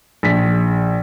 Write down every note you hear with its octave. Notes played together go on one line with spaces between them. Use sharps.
A#1 B6